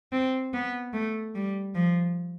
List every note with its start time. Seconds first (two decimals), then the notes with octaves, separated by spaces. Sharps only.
0.12 C4
0.54 B3
0.93 A3
1.35 G3
1.75 F3